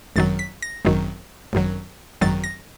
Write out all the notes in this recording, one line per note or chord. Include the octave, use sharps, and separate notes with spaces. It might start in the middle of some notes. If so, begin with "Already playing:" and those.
G#1 F#2 D#3 F#3 A6
B6
A#6
G#1 F#2 D#3 F#3
G#1 F#2 D#3 F#3
G#1 F#2 D#3 F#3 A6
A#6